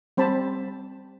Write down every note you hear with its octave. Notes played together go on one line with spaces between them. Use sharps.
G3 C4 C5 A5 B5